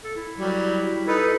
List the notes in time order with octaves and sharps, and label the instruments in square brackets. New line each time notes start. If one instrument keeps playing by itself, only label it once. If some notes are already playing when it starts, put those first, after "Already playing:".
[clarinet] A4
E4
[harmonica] F#3 G3
[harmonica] D#4 B4 [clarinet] A4